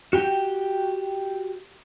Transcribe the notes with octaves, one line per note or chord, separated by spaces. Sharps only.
F#4 G4 G5